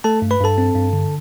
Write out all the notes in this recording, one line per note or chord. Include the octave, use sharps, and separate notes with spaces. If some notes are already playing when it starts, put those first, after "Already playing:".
A3 A4 A5
G2
B4 B5
G2 A4 A5
C4
G2
D3